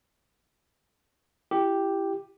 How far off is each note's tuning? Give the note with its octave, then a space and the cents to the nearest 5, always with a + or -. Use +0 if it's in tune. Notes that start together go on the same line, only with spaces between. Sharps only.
E4 +25 G4 +0